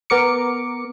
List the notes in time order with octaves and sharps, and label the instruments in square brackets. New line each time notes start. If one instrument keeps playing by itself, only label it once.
[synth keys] B3 A#4 D6 C#7